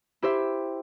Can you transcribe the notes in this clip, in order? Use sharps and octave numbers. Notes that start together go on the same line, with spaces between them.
E4 G4 C5 E5